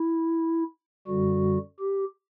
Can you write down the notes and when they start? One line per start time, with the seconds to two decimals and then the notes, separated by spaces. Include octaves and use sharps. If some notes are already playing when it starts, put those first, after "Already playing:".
Already playing: E4
1.07 F#2 D3 G3 F#4
1.80 G4